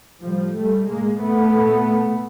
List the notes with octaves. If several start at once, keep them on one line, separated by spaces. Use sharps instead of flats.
A2 F3 G3
G3 A3
A2 G#3 A#3
A3 B3
A#2